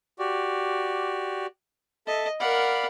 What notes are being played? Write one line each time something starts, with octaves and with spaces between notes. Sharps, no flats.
F#4 G4 D5
A4 D#5 E5 A5
A#4 D5 F5 F#5 B5